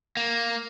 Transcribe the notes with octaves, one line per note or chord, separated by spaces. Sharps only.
A#3